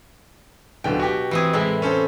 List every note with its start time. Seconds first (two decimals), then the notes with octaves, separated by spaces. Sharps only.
0.84 D1 B2 D3 G5
1.00 F#4 G4
1.31 E3 C4 G#4
1.53 A2 C3 G#3 E4
1.82 C#4 A4 C5